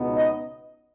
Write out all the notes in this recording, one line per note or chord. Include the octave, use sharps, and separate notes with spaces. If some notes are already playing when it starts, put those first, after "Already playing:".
Already playing: C#2 B2 B3 D#4
D#5